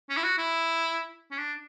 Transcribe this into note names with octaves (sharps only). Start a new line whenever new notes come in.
C#4
E4
F#4
E4
C#4
D4